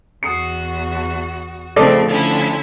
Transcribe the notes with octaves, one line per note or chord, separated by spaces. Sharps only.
E2 F#4 D#6 C7 C#7
C#3 F3 A3 C4 A4 D5 D#5
D3 C#4 E4